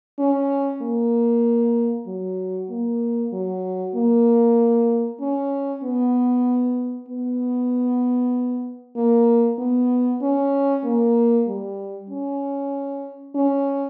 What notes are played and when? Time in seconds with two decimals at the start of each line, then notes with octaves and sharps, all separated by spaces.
0.19 C#4
0.82 A#3
2.07 F#3
2.70 A#3
3.33 F#3
3.95 A#3
5.21 C#4
5.84 B3
7.09 B3
8.97 A#3
9.59 B3
10.22 C#4
10.85 A#3
11.48 G3
12.10 C#4
13.35 C#4